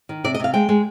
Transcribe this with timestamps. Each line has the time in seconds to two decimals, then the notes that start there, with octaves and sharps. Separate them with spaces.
0.09 D#3
0.24 C3 D5
0.34 D#5
0.40 C3 F5
0.54 G#3 G5
0.69 G#3